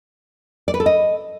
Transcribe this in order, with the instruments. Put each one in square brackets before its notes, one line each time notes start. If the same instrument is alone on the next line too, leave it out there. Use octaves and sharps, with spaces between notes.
[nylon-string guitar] D5
B4
A4
D#5